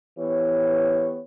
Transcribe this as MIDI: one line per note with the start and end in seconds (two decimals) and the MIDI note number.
0.19 1.20 52
0.19 1.20 59
0.19 1.20 67
0.19 1.20 73